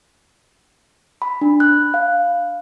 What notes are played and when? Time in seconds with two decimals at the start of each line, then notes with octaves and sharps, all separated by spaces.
1.22 B5
1.41 D4
1.60 F#6
1.94 F5